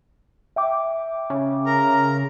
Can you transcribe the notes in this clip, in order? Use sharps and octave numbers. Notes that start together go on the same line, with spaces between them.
E5 G5 D6
C#3
A#4 A#5